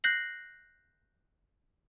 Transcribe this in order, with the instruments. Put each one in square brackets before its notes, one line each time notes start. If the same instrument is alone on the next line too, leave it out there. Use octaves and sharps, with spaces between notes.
[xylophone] F#6 G6 A#6 C7 F#7